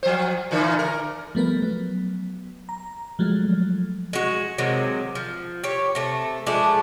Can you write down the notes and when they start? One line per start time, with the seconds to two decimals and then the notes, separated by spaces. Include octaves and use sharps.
0.03 F3 C5
0.51 A#2 D3 E3
0.79 A#4
1.35 F3 G3 A3 B3 A#4 B4
1.62 F#3 B3
2.69 A#5
3.19 F3 F#3 G#3 A3
4.13 G#3 F#4
4.58 C3 D#3 F#3 G#3
5.15 F3
5.64 G4 C#5
5.95 C3 A3
6.46 F3 G#3 A3 D4